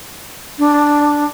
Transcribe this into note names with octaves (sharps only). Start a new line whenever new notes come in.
D4